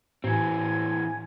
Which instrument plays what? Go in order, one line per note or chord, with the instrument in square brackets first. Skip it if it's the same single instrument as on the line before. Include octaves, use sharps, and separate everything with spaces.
[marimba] A2 [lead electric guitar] E3 C4 [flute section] G#5 G#6